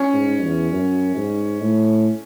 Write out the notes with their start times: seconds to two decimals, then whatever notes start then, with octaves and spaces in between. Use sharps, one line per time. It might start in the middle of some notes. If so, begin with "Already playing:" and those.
Already playing: C#4
0.13 G#2
0.43 E2
0.72 F#2
1.16 G#2
1.61 A2